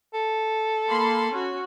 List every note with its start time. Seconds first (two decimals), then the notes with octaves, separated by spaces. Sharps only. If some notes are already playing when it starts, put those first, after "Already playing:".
0.14 A4
0.87 A#3 B5 C6
1.31 C#4 F#4